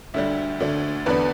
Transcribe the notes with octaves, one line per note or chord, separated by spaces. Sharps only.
D2 D3 G3 E5
D2 D3 A3 D4
E2 D3 B3 D4 B4